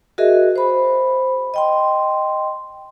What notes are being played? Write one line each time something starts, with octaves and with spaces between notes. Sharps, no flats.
F#4 G#4 A#4 D#5 E5
C5 B5
D#5 G5 C6